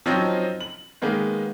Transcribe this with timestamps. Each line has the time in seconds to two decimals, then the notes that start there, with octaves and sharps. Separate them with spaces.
0.06 F3 F#3 C4 C#4 D#4
0.61 F#7
1.02 D#3 G#3 A#3 B3